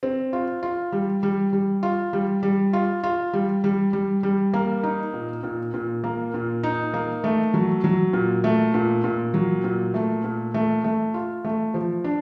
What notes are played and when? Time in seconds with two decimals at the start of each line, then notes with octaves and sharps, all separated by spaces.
0.03 C4
0.33 F4
0.63 F4
0.92 G3
1.23 G3
1.53 G3
1.83 F4
2.13 G3
2.43 G3
2.73 F4
3.03 F4
3.33 G3
3.64 G3
3.93 G3
4.23 G3
4.54 A#3
4.83 D#4
5.14 A#2
5.43 A#2
5.74 A#2
6.04 A#3
6.34 A#2
6.63 D#4
6.94 A#3
7.24 A3
7.54 F#3
7.84 F#3
8.13 A#2
8.44 A3
8.74 A#2
9.04 A#2
9.34 F#3
9.64 A#2
9.94 A3
10.24 A#2
10.54 A3
10.84 A3
11.14 F4
11.45 A3
11.74 F3
12.04 D4